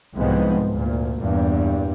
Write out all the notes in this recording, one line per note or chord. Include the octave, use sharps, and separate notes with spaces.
C2 G#2 F3 G#3 B3 C4
D2 A#2
E2 G2 A#2